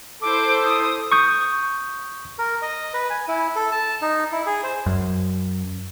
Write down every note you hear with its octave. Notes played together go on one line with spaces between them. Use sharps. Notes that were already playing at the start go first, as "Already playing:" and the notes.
E4 A4 C5 D6
D#6
C#6 D#6 G6
A#4
D#5
B4
G#5
E4
A4
A5
D#4
E4
G#4
C5
F#2